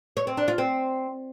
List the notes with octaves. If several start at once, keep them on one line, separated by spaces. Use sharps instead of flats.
C#5
C4
D4
F4
C4